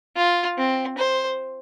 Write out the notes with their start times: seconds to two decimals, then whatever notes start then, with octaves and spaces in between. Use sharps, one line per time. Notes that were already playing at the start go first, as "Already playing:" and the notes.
0.16 F4
0.58 C4
0.98 C5